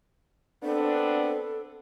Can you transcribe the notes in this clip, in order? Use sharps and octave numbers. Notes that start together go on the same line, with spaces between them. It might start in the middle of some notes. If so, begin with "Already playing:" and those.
B3 C4 D4 A4